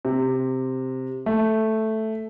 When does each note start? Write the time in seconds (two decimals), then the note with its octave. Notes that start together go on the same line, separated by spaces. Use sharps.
0.05 C3
1.26 A3